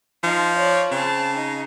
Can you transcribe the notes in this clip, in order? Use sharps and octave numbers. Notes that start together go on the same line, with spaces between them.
F3 D#4
C#5 D5
C#3 C4 A5
D#4